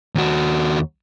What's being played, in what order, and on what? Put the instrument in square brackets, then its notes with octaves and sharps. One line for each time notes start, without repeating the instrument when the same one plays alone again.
[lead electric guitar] D#2 F#4